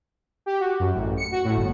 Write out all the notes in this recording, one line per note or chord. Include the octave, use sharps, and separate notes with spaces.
G4
F#4
F#2
A1
C#7
F#4
A2
G1